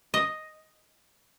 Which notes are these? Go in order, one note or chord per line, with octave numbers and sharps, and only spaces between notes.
D#5